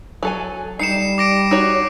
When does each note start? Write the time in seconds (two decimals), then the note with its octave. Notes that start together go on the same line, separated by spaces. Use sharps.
0.23 F#3 A4 G#5
0.79 G3 D#4 C7 C#7 E7
1.18 D6 A#6 D7
1.51 D#4 F#4 C#5